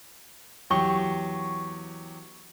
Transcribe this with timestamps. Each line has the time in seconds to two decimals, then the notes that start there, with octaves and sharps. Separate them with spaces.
0.70 E2 F#3 G4 C#6 G7